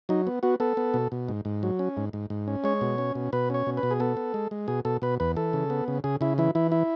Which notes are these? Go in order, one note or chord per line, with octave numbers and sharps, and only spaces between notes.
F#3 D#4
B3
B3 F#4
B3 A4
B3
B2
B2
G#2
G#2
F#3
C#4
G#2
G#2
G#2
C#4
G#3 C#5
B2
C#4
B2
B2 B4
C#4 C#5
B2
B4
B2
G#4
B3 A4
B3
G#3
G#3
B2 G#4
B2 A4
B2 B4
E2 B4
E3 A4
C#3
B3
C#3
C#3 G#4
C#3 E4
E3 E4
E3 E4
E4